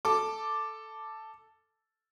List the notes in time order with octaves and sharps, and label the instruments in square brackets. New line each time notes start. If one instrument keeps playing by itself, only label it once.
[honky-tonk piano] A4 D6